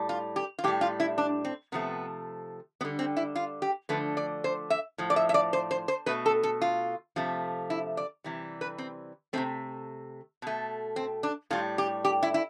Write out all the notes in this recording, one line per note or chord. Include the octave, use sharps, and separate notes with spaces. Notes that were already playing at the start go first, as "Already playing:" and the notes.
Already playing: A2 G3
F4
G4
F4
A2 G3 G4
F4
E4
D4
C4
C3 F3 A3 B3
D3 G3 B3
C4
E4
F4
G4
D3 F3 A3 B4
D5
C5
E5
A2 F3
D5
E5
E5
D5
C5
C5
C5
B2 A3 B4
A4
A4
F4
C3 F3 A3
E4
D5
C3 E3 G3
B4
C4
C3 F3 A3 C4
B2 A3
C4
D4
A2 G3 F4
G4
G4
E4
E4